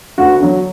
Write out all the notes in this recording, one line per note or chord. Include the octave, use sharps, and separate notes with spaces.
D2 F#4
D3 F#3